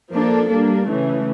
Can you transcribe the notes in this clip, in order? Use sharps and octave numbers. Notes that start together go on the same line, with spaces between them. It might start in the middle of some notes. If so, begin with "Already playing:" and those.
F3 A#3 D4 A4
G3 A#3 D4
C#3 E3 A3